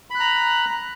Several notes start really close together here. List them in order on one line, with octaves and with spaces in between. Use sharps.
B5 F#6 A#5